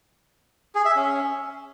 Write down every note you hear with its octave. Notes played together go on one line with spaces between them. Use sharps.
G#4
E5
C#4